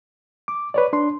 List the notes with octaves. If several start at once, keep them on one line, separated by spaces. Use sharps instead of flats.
D6
B4 C#5 D5
D4 C6